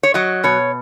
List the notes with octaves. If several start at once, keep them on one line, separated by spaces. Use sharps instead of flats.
C#5
F#3 D#5
B2 C#5